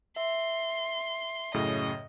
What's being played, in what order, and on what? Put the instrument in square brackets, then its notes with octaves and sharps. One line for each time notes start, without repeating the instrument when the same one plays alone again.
[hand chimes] E5 [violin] C6
[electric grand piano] F#2 A2 C#3 [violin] D#5